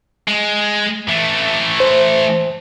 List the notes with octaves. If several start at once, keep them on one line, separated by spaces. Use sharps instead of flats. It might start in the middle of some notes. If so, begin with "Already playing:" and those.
G#3
E3 A3
C5